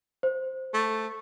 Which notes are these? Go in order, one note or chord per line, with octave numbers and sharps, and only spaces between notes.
C5
A3